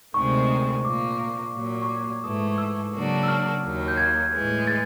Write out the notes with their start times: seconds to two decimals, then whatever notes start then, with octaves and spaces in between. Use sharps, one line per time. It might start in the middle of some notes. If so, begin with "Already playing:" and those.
0.14 D2 C3 D#3 G#3 C4 C#6
0.84 A#2 F3 A#3 D6
1.53 A#2 F#3 A#3
1.82 C#6
1.89 D6
2.24 G#2 E3 A3 D#6
2.58 E6
2.93 C#3 F#3 A#3 D4 F#4
3.23 E6
3.28 F6
3.63 D#2 D#3 F#3 A#3
3.88 G6
3.97 G#6
4.32 A2 E3 G#3
4.68 A6